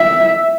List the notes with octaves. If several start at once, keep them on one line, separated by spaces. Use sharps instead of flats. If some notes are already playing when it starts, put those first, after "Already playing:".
Already playing: E5